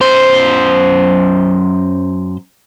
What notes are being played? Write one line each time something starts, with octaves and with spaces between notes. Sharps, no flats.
F#2 C5